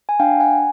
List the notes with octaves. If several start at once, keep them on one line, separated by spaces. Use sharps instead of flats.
G#5
D4 F5 G5
F#5 G#5